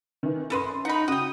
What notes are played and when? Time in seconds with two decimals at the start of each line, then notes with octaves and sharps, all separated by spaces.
0.23 D#3 E3
0.50 F#2 A4 B4 D#5 C6
0.85 D#4 F#5 B5
1.08 C#3 F#4 G5 D#6